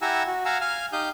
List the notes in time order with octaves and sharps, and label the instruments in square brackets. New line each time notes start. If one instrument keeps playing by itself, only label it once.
[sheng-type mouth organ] E4 G4 F#5 G#5 A#5 E6
F#4
F5 F#5 G#5 A#5 E6
F5 G#5 F6
D#4 G4 F5 D#6 G6